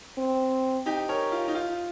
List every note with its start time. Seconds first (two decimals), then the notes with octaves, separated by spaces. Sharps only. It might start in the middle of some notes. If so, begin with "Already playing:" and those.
0.18 C4
0.86 D#4 G4
1.09 A#4 C#5
1.32 F4
1.48 D#4
1.55 F4